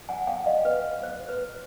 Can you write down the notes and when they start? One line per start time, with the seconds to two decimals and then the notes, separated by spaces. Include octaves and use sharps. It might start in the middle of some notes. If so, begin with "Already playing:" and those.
0.09 F#5 G#5
0.27 F5 G5
0.46 D#5 F5
0.65 B4
1.03 C5
1.29 B4